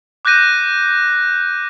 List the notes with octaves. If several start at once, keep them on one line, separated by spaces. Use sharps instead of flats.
D6 F#6 G6 A#6 D#7